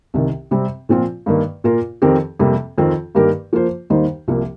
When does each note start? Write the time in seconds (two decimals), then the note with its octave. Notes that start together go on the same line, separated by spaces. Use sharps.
0.14 C2 C3 D#3
0.51 C3 G3 C4
0.89 A#2 F3 C4 F4
1.26 G2 D#3 A#3
1.64 A#2 A#3 F4 A#4
2.02 F2 D#3 C4 G4 A#4
2.39 F2 C3 G3 A#3
2.78 F2 D#3 C4 F4
3.15 G2 D#3 A#3 G4 A#4
3.53 F3 A#3 F4 C5
3.90 D#2 D#3 G3 D#4 C5
4.28 C2 C3 F3 A#3